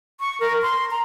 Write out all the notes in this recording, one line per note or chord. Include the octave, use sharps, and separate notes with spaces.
C#6
A#4
C6
A#5